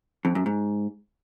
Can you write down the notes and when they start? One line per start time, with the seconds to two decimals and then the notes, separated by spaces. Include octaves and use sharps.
0.25 F2
0.35 F#2
0.46 G#2